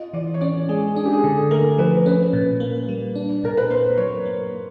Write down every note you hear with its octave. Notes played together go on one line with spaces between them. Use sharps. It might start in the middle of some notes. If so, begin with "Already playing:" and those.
Already playing: F4 D#5
E3 D5
C#5
C#4 D5
G#3 G#4
D4 G#4
G4
G#4
D3 A4
A3 A#4
F3 B4
C#4 B4
A#2
A#3
G3
D4
A#2 A#4
B4
A#3 C5
F#3 C#5
A#3